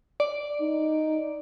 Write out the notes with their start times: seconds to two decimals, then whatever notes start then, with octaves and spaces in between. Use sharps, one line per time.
0.20 D5
0.61 D#4